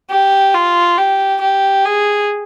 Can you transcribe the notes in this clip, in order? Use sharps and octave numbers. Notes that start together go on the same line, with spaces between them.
G4
F4
G4
G4
G#4